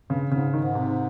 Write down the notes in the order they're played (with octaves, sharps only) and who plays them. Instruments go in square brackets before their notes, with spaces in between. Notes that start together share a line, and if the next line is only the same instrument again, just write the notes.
[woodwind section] G2 [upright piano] C#3
[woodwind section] G#2 [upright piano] C#3
[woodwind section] G#2 [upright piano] D#3
[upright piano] C3